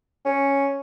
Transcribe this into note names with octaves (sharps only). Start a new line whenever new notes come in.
C#4